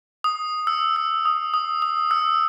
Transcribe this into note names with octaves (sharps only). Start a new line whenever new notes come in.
D#6
E6
E6
D#6
D#6
D#6
E6